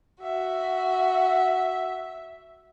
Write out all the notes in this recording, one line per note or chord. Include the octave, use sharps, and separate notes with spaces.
F#4 E5